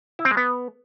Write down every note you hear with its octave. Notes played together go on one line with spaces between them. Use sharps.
E4
C4
G#3
B3